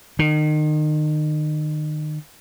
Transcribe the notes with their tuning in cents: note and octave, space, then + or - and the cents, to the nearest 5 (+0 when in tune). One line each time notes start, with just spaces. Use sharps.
D#3 -30